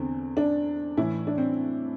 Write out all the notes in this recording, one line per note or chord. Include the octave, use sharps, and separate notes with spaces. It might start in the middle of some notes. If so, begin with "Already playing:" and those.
Already playing: E2 D3 C4
D4
A2 E3 E4
D4
C4